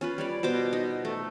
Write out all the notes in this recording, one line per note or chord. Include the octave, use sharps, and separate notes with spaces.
C#4 F4 B4
G3 C#5 D5
B2 C5 D6
D#4
A3